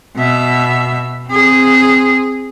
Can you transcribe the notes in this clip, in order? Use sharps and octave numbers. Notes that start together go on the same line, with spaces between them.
B2 E5
C4 G#4